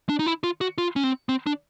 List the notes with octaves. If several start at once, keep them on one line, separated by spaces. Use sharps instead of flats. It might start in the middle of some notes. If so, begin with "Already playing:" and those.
D4
D#4
E4
F4
F#4
F4
C#4
C4
C4
D4